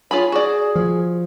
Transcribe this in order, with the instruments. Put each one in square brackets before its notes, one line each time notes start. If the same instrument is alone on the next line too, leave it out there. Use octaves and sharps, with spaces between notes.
[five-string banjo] F4 G#4 B5 [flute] C#5
[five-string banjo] F#4 D5 [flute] G#4
[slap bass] F3